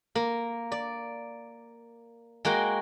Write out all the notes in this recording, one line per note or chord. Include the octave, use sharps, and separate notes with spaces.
A#3
D5
G#3 A#3 F#4 G5